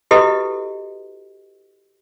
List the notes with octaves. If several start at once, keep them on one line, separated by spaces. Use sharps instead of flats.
E4 F#4 G4 A4 B4 D#5